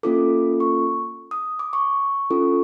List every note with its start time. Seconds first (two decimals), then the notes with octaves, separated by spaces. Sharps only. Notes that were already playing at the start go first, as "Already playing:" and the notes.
0.03 A#3 C#4 F4 A4 D6
0.60 C#6
1.31 D#6
1.59 D6
1.73 C#6
2.30 C#4 F4 A4